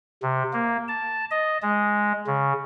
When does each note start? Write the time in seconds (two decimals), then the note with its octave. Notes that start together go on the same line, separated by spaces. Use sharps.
0.23 C3
0.53 A#3
0.88 A5
1.31 D#5
1.62 G#3
2.27 C#3